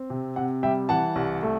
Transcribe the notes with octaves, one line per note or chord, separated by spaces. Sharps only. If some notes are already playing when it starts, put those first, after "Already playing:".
Already playing: C4
C3
C3 F#5
G3 E5 G5
E3 F#5 A5
C2
A3